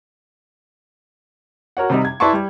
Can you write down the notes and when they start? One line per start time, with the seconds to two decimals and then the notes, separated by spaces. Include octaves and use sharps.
1.77 F#4 A#4 C#5 F#5
1.90 C3 G3 D#4
2.05 G#6
2.20 E4 B4 D5 A5 C6 C#6
2.33 G3